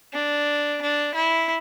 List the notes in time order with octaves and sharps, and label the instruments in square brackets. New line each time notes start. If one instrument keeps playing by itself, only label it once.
[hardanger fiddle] D4
D4
E4